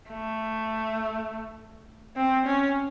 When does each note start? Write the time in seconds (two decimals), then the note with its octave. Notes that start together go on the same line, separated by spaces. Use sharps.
0.10 A3
2.16 C4
2.46 C#4